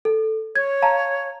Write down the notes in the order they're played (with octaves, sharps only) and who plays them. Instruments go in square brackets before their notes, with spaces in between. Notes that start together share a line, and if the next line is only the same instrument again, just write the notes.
[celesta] A4
[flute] C#5 [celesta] G#6
[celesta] F5 A5 A#5